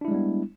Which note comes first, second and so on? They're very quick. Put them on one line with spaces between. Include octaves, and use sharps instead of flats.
D4 E4 G#3 G3 B3